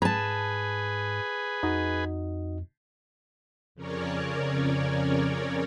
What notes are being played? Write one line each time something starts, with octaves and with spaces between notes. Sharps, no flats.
G#2 G#4 B4 A5 A#5
F2 D#4 F#4 D#5
F2 C#3 C#4 A#4 C#5 D5